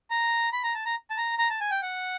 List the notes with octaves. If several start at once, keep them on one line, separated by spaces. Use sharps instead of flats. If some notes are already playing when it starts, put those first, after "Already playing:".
A#5
B5
A#5
A5
A#5
A5
A#5
A#5
A5
G#5
G5
F#5